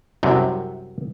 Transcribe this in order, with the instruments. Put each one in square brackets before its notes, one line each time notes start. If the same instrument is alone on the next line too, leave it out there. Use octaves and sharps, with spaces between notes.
[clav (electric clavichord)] C2 F#2 C3